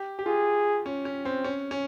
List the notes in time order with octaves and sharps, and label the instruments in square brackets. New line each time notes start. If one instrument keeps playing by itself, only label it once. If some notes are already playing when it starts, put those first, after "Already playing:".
Already playing: [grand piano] G4
G4
[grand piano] F4 [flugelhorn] G#4
[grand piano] C#4
C#4
C4
C#4
C#4